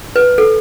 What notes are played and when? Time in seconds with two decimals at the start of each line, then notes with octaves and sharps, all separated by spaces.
0.16 B4
0.38 A4